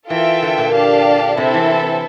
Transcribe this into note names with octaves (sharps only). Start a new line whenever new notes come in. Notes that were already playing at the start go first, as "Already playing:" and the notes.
E3 F4 A4 E5 G5
D3
A#2
D4 G4 D5 F5 A5
C3 C4 E4 A4 E5
E3